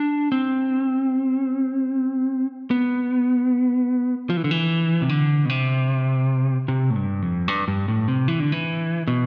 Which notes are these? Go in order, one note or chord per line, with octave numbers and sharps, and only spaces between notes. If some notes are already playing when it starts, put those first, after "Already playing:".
Already playing: D4
C4
B3
F3
E3
D3
E3
C3
D3
B2
C3
C3
A2
G2
F2
G2
G2
A2
C3
E3
D3
E3
B2